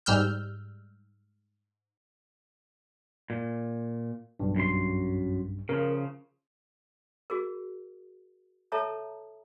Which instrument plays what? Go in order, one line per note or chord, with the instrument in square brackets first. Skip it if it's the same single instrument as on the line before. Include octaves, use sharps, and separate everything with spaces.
[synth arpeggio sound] G#2 G3 E6 F6 G6
[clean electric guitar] A#2
[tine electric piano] B1 G2
[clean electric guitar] F#2 C6
[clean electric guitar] C#3 F3 [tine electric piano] A#4
[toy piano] F#4 G#4 A#4
A4 C#5 E5 A5 A#5 D#6